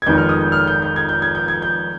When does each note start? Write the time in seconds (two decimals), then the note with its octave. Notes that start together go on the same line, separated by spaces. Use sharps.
0.02 G#6
0.06 F1 F2 D#3 G#3 B3 G6
0.18 F6
0.29 D#6
0.41 G6
0.52 F6
0.67 G6
0.82 G6
0.96 G#6
1.09 G6
1.22 G#6
1.35 G6
1.48 G#6
1.62 G6